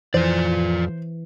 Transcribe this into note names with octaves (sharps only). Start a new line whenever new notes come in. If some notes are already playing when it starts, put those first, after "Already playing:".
F2 E3 F4 C5 D5